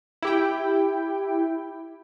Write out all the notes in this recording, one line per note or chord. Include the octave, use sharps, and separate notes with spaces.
E4 G4 G5